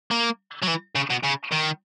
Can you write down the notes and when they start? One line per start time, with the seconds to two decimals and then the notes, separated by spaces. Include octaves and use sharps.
0.11 A#3
0.62 F#3
0.67 E3
0.96 C#3
1.10 B2
1.24 C#3
1.52 D#3